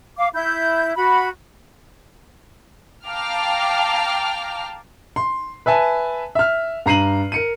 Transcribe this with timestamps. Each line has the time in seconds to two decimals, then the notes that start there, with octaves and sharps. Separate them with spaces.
0.17 F5 D6
0.34 E4 G6
0.95 F#4 B5
3.06 F5 G5 A5 A#5 D6 F6
5.16 C6
5.66 B4 E5 G#5 A5
6.35 E5 F6
6.86 G2 A#5 C7 D#7 F#7
7.32 A#4 C#7 D#7